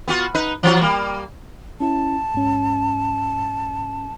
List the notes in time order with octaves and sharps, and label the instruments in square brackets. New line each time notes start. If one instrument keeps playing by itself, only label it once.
[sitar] B3 F4 F#4
D#4 B4
E3 F#3 F#4
G3 A#3
[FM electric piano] C#4 E4 [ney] A5
[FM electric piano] G#2 C#4